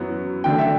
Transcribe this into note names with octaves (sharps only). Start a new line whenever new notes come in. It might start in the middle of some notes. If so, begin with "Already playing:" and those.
Already playing: F#2 F#3 B3 E4
D3 F#3 A3 D4 G5
E5